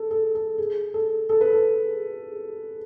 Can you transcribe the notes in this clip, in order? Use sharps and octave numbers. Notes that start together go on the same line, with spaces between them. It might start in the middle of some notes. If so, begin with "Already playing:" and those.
Already playing: A4
A4
A4
G#4
A4
A4
B4
A4